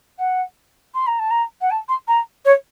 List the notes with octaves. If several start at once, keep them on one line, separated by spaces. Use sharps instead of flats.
F#5
C6
A#5
A5
A#5
F#5
A5
C6
A#5
C#5